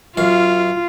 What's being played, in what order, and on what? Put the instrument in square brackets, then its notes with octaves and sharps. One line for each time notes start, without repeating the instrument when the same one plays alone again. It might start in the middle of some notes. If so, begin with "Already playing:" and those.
[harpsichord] F#2 F5 [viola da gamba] F4